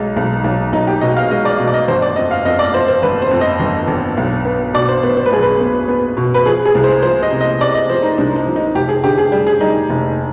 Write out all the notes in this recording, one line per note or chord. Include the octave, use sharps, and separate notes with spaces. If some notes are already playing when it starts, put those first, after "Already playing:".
Already playing: B1 G#3 D#4
B1
B1
B1 D#4
G4
B2 D#5
F5
G#3 D#5
D5
B2
D5
D#5
G1 C5
D5
F2 D#5
F5
F2 D#5
D5
F2 C5
C5
G1 B4
C5
F2
D#5
G1
G1
B1
B3
B2 D5
C5
B3 C5
C5
B4
B1 G#4
B4
B3
B3
B2
B4
F3 G#4
G#4
C2
C5
F3 C5
D#5
C3
D#5
C3 D5
D#5
F3 C5
D#4
C2 D4
D#4
F3
D#4
F1 G4
G#4
D3 G4
G#4
G3
G#4
G3 D#4
F1